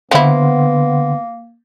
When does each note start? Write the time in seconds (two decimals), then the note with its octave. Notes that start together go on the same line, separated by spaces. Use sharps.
0.11 D3 F3 A#3 B3 E4 F#5 C6